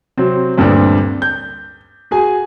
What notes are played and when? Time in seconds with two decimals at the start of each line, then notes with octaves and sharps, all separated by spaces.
0.17 C3 F#3 C4
0.58 D2 G2 A#2 C4 D4
1.22 G6
2.11 F#4 G#4 G#5